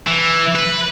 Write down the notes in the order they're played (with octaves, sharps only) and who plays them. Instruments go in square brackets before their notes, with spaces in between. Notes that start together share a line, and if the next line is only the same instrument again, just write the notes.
[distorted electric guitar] E3
B4